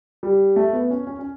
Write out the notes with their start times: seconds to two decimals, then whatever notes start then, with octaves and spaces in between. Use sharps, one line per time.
0.23 G3
0.56 A3
0.73 B3
0.90 C#4
1.07 C#4
1.19 C#4